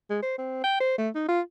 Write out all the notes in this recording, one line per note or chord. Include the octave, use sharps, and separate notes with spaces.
G#3
C5
C4
G5
C5
A3
D#4
F4